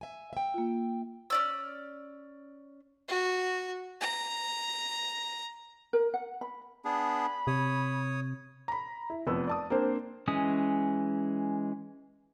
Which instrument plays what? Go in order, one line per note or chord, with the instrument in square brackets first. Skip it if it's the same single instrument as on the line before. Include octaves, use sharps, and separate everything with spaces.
[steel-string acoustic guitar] E5 G#5
E5 G5
[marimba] A#3 F4
[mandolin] C#4 D5 E6
[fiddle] F#4
A#5
[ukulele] A#4
F#5
B5
[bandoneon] B3 D4 G#4 [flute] B5
[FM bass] C3 [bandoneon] C#5 D#6
[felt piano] A#5 B5
E4
F1 F2 B3 E6
D5 A5 D#6
A#3 C4 D4 C5
[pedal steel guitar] E3 G#3 C#4 D#6